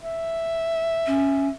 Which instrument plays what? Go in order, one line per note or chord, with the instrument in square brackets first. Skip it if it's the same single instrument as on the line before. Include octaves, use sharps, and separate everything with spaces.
[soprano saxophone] E5
[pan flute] C#4